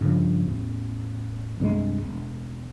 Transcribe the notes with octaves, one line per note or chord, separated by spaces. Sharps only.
G2 C#3 F3
A1 E2
C2 G2 G3 G#3
E1